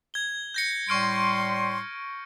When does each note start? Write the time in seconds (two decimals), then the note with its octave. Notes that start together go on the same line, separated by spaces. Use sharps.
0.14 G#6 G7
0.54 G6 A#6 C#7
0.89 A2 G3 C6 C#6 F6 D7